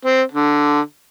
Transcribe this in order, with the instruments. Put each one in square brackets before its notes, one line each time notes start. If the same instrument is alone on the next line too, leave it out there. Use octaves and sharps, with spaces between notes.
[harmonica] C4
D3